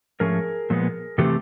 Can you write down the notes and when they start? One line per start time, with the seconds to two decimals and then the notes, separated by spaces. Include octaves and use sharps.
0.20 G#2 F3 A3 C#4 G#4 A#4
0.70 A#2 F3 G#3 B3
1.18 C3 E3 A3 C4 G4 A4